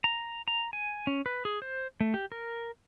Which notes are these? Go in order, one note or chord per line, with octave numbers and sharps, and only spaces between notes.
A#5
A#5
G#5
C#4
B4
G#4
C5
A3
G4
A#4